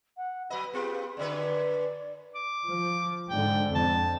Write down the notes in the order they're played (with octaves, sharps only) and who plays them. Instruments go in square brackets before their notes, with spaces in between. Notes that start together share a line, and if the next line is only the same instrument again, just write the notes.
[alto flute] F#5
[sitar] F#3 B4 D#5 [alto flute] B5
[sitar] B3 F4 G4 [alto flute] G#4
[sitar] F#2 D3 B4 [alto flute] D5
[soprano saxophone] D6
[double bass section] F3
[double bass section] G#2 D3 [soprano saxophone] G5
[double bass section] F2 [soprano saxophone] A5